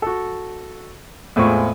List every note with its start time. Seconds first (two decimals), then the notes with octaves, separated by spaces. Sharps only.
0.02 F#4 A4
1.36 E2 A2 G#3 C4 F4 C#6